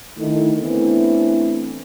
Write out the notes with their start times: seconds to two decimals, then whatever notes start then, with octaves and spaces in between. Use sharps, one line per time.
0.17 D3 D#3 A3 D#4 E4
0.59 E3 A3 B3 C4 D4 E4